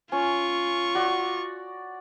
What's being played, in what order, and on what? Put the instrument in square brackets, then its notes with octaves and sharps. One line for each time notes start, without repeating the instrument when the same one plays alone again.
[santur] C#4 [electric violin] F4 C#6
[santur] F#4 D5